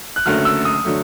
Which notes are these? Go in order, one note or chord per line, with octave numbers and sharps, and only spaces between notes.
F#6
F#1 F#2 D3 F#3 A3 F6
E6
D#6
D3 F#3 A3